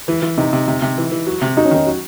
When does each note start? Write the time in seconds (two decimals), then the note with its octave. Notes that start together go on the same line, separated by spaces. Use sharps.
0.08 E3
0.22 E3
0.37 C3 D#4
0.53 C3
0.68 C3
0.82 C3
0.98 E3
1.12 E3
1.26 F#3
1.42 C3
1.57 F#3 D#4
1.65 C#4
1.71 D#3 D#4
1.86 F#3